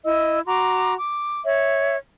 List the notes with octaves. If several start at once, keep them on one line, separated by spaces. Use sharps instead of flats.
E4 D#5 E6
F#4 A#5 C6 D6
D6
C#5 E5